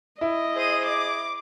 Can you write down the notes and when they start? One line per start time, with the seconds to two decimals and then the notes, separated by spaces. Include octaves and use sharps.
0.21 E4 D#5
0.55 G#4 C5 D#7
0.85 D6